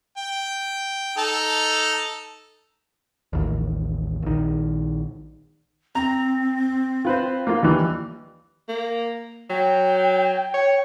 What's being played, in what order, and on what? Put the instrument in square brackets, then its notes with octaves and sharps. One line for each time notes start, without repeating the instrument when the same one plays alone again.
[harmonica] G5
D#4 A4 A5
[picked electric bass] A1 D#2
A#1 D#3
[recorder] C4 [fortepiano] A#5
[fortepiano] F4 B4 C5
A#3 F4
D#2 E3 G3
[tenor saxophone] A#3
[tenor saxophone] F#3 [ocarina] G5
[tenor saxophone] C#5